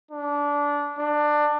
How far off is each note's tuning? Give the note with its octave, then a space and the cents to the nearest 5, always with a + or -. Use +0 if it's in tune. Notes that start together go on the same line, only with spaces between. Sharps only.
D4 -20
D4 +20